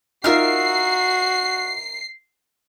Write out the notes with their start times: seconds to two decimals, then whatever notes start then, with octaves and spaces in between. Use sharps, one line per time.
0.24 D#4 F4 F#4 A#4 E5 F6 C7